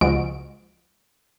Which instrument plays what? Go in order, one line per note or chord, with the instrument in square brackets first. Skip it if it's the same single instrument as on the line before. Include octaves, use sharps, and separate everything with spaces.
[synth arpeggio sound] C#2 F3 G#3 F#4 D7